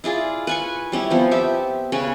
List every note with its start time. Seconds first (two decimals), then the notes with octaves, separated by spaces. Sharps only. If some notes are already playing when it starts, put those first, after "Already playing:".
0.04 E4 F4 G#4 D5
0.47 B4 G#5 C#6
0.92 G3 C#4 E4
1.10 F3 B3 C4
1.31 G4 E5
1.92 C#3 C#4 B4